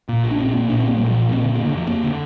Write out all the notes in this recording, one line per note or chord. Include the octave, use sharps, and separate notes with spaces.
A#2
A#1
D4
A#2 C4
A#1 A#3
A#2 D4
A#1 C4
A#3
A#2 G3
F3
A#1
F3
A#2 C4
D3 C4
A#3
F1
D3
F1 F3
F2 A#3
D3